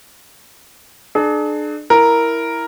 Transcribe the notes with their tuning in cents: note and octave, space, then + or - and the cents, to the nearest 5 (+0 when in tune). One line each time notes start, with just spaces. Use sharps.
D4 +30 G#4 +40
E4 +0 A#4 +0